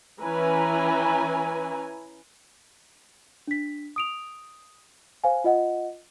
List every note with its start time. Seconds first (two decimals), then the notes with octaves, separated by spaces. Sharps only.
0.21 E3 C#4 E4 B4 G#5 A#5
3.47 D4 B6
3.96 D#6 D7 F7
5.24 C5 F5 G#5
5.44 F4 D#5 F#5